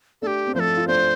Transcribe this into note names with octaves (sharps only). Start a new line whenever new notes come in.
A3 D4 G4 A4
C4
F3 A3 A4 C5
F4
A3 D4 C5